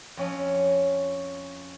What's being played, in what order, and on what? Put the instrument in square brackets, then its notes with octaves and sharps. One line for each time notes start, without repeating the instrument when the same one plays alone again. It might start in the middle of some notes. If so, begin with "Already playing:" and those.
[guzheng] F2 C#4